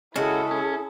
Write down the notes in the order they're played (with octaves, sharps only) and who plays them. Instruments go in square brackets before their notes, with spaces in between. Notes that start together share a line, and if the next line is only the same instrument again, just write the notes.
[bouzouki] C#3 G#3 [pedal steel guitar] C#4 F#4 [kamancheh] E4 A4 [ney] G#4
[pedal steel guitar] C#4